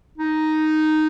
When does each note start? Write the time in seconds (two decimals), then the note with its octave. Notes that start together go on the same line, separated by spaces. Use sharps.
0.18 D#4